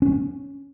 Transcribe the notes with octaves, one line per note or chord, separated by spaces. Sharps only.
C#4